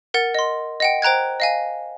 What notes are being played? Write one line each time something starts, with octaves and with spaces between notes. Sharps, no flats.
A#4 F#5 A6
D#5 C6
D#5 F#5 G5
C5 G5 A#5 F#6 G#6
D#5 F5 G#5